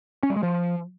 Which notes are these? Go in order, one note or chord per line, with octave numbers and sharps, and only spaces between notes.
C#4
G3
G#3
F3